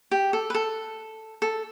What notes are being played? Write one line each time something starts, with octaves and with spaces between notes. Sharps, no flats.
G4
A4
B4
A4
A4